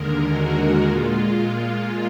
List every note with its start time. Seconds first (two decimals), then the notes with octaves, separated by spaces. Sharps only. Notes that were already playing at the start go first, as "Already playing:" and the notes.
Already playing: D#2 D3 G#3 A#4
0.29 F#4
0.82 A#2 G#3 F4